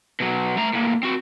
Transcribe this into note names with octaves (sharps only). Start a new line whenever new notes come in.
B2 F#3
A3 A#5
A2 A#3
C4 F#4